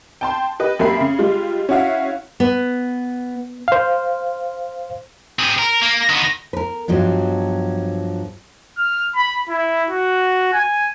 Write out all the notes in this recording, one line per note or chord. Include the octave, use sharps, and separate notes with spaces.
G5 A5 C6
G4 B4 D#5
F#2 A#3 G4 E5 B5 C7
C#3
G3 G#3 F4
C#4 E4 F#4 E5 F5
B3
C5 F5
C4 G#4
A#4
A#3
D#3 B3
A#4 B4
G2 F3 F#3 G#3 B3
F6
B5
E4
F#4
G#5